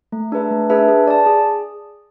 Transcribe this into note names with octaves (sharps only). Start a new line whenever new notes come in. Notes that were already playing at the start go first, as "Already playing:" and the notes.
A3
D4 G#4 B4 E5
A3
D4 G#4 B4 E5
G#4
D5 A5
G#4